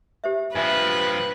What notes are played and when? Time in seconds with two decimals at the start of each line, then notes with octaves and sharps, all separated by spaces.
0.24 G4 C5 E5
0.55 G2 F3 B4 E5 G#5